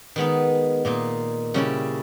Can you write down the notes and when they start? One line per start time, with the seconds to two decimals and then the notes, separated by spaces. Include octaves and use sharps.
0.16 D#3 G#3 B3 D#4
0.85 A#2 A#3 D#4
1.54 C#3 G3 C#4 E4